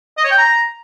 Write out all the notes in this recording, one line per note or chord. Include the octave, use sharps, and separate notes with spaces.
D#5
C#5
G5
A#5